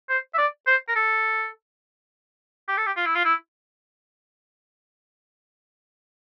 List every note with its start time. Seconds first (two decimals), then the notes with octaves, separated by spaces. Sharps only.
0.09 C5
0.34 E5
0.38 D5
0.67 C5
0.88 A#4
0.96 A4
2.68 G4
2.77 A4
2.86 G4
2.97 F4
3.06 E4
3.15 F4
3.25 E4